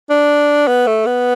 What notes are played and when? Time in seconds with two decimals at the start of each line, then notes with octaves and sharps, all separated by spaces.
0.10 D4
0.68 B3
0.87 A3
1.06 B3